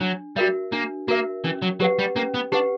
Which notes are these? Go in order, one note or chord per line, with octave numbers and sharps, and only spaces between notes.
F#3 D4
G3 F#4 A#4 E5
A#3 D4
A#3 F#4 A#4 E5
E3 C#4
F#3
F#3 G4 B4 F#5
G3
A#3 C#4
B3
D4 G4 B4 F#5